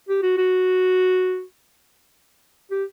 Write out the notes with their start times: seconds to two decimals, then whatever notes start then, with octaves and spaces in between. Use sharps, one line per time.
0.09 G4
0.22 F#4
0.38 F#4
2.71 G4